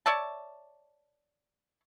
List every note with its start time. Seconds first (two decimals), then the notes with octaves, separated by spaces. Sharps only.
0.06 C#5 D5 E5 A5